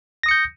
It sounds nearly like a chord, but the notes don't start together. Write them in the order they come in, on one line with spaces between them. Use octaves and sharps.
A#6 D#6 C#7 G6